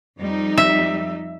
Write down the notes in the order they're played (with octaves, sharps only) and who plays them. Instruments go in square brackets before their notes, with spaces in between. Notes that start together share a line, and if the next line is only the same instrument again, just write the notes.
[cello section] F2 G3 D#4
[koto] E5